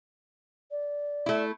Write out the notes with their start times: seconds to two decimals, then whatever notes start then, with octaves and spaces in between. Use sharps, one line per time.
0.71 D5
1.26 A3 E4